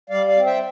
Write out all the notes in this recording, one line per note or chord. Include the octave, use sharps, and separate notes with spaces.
G3 D5 F5
D5 F5
C4
E5 G5